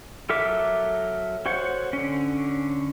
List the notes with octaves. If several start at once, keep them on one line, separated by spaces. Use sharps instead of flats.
F#3 A4 A#4 E5 D6
F#4 C5 C#5 F#5
D3 C#4